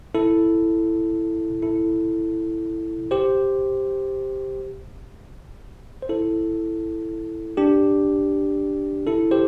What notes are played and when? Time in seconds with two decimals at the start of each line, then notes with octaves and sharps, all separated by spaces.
0.15 E4 A4
1.63 E4 A4
3.11 G4 C5
6.02 C5
6.09 E4 A4
7.57 D4 G4
9.07 E4 A4
9.31 G4 C5